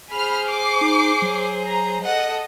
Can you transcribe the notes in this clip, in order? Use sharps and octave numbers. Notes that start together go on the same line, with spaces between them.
G#4 C5 B5 F6
D6 C7
D#4
F#3
A#5
A4 D#5 F#5